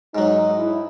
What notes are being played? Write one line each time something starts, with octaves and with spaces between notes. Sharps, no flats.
G#2 F#3 D#4
E4